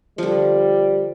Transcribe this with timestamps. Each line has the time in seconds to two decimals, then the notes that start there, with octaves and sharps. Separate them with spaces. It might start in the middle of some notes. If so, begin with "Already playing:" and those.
0.18 D3 F3 G3